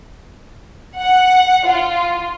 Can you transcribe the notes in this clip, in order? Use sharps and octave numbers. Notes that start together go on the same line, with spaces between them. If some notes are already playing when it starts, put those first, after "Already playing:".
F#5
F4